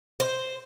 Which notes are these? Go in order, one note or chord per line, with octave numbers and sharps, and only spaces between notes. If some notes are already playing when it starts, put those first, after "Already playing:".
C5